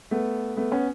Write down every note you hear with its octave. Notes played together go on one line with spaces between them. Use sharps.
A3 B3
A3 B3
B3 C#4